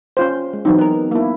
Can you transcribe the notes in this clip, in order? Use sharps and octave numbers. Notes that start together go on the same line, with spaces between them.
C#4 F4 C5
G#3
E3 F#3 C4 D#4
B3 A#4
A#3 E4